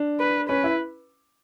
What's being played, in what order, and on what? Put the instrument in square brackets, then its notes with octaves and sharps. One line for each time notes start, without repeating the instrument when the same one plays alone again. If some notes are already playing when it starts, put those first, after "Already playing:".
Already playing: [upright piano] D4
[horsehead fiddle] B4
[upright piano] C#4 [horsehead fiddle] B4
[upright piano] E4